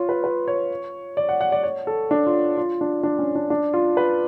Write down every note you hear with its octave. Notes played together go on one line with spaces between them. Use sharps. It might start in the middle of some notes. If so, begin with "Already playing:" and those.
Already playing: F4 C#5
B4
B4
C#5
D5
F#5
F#5
D5
C#5
A4
D4
F4
F4
D4
D4
C#4
D4
D4
F4
B4